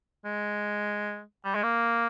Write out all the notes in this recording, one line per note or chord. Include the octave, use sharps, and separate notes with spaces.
G#3
G3
G#3
A#3